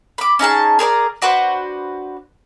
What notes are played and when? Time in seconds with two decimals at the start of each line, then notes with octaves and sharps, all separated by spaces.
0.18 B5 D6
0.39 C#4 D#4 G#4 A5
0.79 G#4 A#4 C5 D5
1.22 D4 F#4 B4 C5